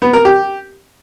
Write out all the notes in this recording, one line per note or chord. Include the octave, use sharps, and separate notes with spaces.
B3
A#4
G4